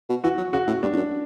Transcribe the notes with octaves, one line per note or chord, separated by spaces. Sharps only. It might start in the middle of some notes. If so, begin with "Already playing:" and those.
B2
E3 F#4
F#3
C#3 F#4
A2
G2 D4
E2
F#2